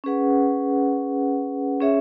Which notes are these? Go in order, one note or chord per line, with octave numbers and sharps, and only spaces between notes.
C#4 G#4 B4 F#5
C#4 G#4 C#5 E5